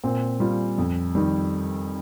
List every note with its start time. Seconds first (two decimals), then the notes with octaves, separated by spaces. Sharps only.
0.04 A#2 C4
0.40 G3 F4
0.78 F2
1.15 D#3 G3